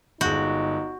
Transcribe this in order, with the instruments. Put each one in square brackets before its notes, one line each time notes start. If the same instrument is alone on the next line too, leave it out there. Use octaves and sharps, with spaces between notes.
[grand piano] G1 G#3 G6 [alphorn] D#4 [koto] F#4